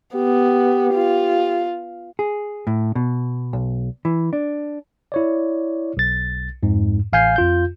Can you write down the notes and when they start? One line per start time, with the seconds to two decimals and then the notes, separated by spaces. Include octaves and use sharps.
0.16 B3 G4
0.94 F4
2.19 G#4
2.67 A2
2.95 B2
3.53 B1
4.05 E3
4.33 D4
5.12 E4 C#5 D5
5.97 B1 A6
6.63 F2 G#2
7.13 A1 F5 G#5 G6 C7
7.36 F2 F4 G6